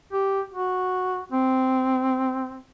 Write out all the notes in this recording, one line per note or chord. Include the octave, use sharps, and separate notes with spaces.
G4
F#4
C4